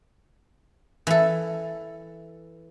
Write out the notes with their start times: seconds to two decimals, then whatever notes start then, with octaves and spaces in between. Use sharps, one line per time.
1.07 E3 A4